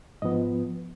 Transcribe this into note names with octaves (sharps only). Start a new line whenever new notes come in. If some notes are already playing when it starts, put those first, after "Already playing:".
G#2 F3 B3 D#5